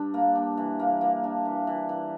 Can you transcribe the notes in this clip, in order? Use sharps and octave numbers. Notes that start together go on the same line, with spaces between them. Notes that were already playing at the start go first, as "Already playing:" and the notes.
Already playing: G2 D4
A#3
D4
E3
A#3
A#3
D4
E3
E3
E3